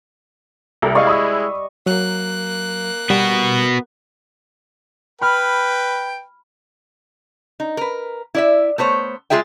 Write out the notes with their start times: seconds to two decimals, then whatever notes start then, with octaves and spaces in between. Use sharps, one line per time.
0.82 C2 G3 A4 A#4
0.95 G#3 E4 D5 D#5 F5 C#6
1.07 B5 D#6 E6
1.86 F#3 A#3 F#6
3.10 G3 B3 F#4
5.21 B4 G5 B5 F6
7.60 D#4
7.77 A#4 B4
8.35 E4 D5 E5
8.78 A3 B3 C5 C#5
9.30 G#3 A#3 F4 G#4 E5 G5